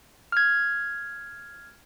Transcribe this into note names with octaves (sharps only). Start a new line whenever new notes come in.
F6 G#6